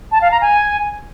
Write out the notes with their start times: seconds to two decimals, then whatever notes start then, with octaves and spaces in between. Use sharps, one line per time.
0.12 A5
0.22 F5
0.31 A#5
0.41 G#5